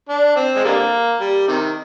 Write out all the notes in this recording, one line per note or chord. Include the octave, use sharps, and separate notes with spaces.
D4
C4
G#3
D3 G3 A#3
G3
C3 D#3